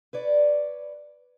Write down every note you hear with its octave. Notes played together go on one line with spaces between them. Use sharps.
B4 C#5 D5